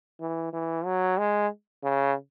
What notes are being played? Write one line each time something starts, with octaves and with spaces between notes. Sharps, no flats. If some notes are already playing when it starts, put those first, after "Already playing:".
E3
E3
F#3
G#3
C#3